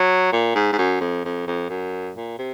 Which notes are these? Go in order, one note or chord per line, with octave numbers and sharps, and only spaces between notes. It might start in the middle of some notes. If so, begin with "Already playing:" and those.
Already playing: F#3
A#2
G#2
G#2
F#2
F2
F2
F2
F#2
A#2
C3